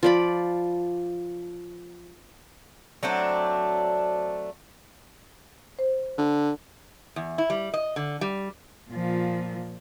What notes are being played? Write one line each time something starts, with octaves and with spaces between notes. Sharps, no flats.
F3 D5 B5
F#3 A3 C4 D4
C5
D3
E2
E4
G3
D#5
D3
G3
A#2 F3